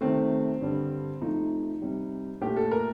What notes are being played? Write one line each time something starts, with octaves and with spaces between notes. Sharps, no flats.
C3 D#3 A3 C4
G2 D3 G3
C3 F3 A3 D#4
C3 G3
A#2 A3 G4
A4
A#4